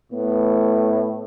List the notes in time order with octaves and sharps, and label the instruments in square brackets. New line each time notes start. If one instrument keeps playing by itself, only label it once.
[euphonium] A2 [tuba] B3